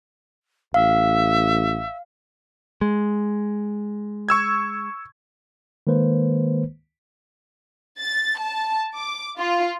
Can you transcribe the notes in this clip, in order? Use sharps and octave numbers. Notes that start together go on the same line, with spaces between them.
A1 E5 F5
G#3
C#6 E6 G#6
D#3 G#3 A#3 B4 C5
A6
A5
D6
F4